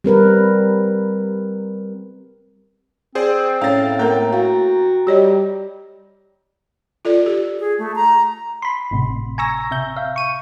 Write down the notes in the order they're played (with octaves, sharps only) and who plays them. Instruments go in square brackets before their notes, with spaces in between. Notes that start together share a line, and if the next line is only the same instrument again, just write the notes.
[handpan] G3 C4 A#4 B4
[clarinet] C4 [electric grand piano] G#4 C5 D5
[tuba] A2 [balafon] C#4 C#5 [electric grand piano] F5 A6
[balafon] A#3 A4 A#4 [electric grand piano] G5 A#5
[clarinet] F#4 [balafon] F5
[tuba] G3 [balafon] G4 C#5 D#5
[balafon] F4 A4 D5
G4
[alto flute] G#4
A3
A#5
[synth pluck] B5 C6
G#1 A2 C3
G#5 A#5 C#6 E6 A#6
C3 E5 G6
E5 F5
C#6 D#7